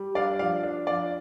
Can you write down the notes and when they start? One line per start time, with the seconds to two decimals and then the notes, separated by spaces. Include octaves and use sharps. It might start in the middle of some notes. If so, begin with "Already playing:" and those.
Already playing: G3
0.15 D4 D5 F5
0.39 F3 D5 F5
0.64 D4
0.87 F3 D5 F5